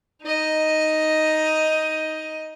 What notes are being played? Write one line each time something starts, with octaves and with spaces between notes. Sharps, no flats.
D#4 D#5